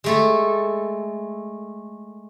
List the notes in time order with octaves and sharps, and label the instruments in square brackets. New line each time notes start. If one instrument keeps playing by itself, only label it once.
[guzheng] G#3 A3 A4